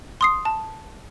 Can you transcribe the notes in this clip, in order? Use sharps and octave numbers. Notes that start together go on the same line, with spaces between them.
C6 D#6 C7
A5